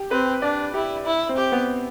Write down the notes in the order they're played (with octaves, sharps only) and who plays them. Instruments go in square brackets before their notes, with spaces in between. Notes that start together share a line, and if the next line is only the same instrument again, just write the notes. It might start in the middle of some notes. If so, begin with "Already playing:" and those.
Already playing: [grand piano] G4
[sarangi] C4 [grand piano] B4
[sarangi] D4 [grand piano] D5
[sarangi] E4 [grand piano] G4
[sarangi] E4
[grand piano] C4
[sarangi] G4
[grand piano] B3